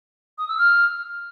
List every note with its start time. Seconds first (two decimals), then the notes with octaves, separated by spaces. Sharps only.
0.38 D#6
0.48 E6
0.58 F6